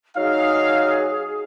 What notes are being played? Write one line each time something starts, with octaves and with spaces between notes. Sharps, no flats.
F#3 D#4 G#4 F5